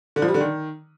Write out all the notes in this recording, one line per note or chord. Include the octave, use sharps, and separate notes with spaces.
D3
F3
G3
D3
D#3